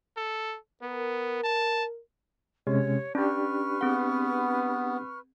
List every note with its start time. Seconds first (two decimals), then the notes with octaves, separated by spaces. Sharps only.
0.17 A4
0.83 B3 A#4
1.44 A5
2.67 C3 G#3 C#4 G4 C#5
3.15 C#4 D4 G4 B4 C#6 F6 A6
3.81 B3 C4 G#4 F#5